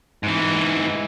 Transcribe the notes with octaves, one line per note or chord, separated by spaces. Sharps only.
G#2 E3